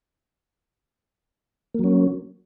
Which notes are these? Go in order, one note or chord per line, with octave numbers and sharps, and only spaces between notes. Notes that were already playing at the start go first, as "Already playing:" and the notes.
F#3 A#3 C#4